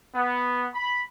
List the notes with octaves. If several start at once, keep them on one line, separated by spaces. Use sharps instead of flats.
B3
B5